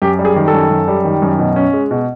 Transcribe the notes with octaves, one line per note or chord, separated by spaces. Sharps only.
F#2 G4
G3
G#4
D#3
A4
F#2
F#2
G3
D#3
F#2
B2
C#4
G#3
B2